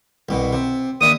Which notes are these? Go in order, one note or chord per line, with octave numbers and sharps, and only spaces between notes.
C2 B2
C3
D#2 D4 E5 D#6